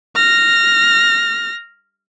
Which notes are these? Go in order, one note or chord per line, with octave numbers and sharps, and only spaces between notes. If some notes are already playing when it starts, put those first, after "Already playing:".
F6 A#6